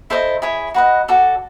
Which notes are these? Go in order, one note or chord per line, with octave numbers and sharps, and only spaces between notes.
E4 A4 C5 D#5
E4 G#4 C#5
F#4 B4 D#5
F#4 A4 D5